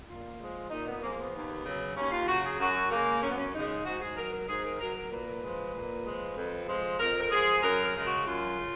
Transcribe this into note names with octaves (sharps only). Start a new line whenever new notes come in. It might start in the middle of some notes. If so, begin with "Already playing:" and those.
A#2 F4
F3 G#3
A#2 D#4
B3
F3 G#3 A#3
B3
D#2
C#3 F#3
D#2 C#4
F4
C#3 F#3 F#4
G#4
F#2 F#4
C#3 G#3 A#3
F#2 C#4
B3
C#4
C#3 G#3 D#4
G#2 F#4
G#4
F#3 A#4
A#4
G#2 G#4
A#4
F#3 A#4
A#4
A#2 B4
F3 G#3
A#2
F3 G#3
F2
F3 G#3
F2 A#4
A#4
F3 G#3 G#4
F#2 A#4
A#4
C#3 G#3
F#4
F#2 F4
C#3